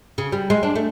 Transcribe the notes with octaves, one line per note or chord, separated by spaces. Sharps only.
C#3
G3
G#3
D4
A3